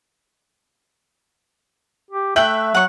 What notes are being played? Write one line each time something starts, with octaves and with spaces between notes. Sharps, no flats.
G4
A3 E5 G5 F#6 F#7
F#3 F#5 C#6